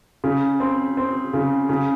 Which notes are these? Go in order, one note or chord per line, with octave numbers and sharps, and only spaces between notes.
C#3
C4
C4
C#3
C#3